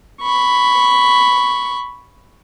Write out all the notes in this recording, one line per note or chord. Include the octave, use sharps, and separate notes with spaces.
B5 C#6